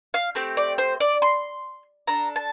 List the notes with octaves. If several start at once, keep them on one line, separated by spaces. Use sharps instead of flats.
F5
A3 C4 G4
D5
C5
D5
C6
D4 A4 A#5
A5